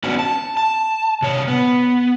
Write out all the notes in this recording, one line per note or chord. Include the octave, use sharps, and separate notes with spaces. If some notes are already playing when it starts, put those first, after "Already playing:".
B3 C#4 D4 F#4
A5
A5
C3 C#5
B3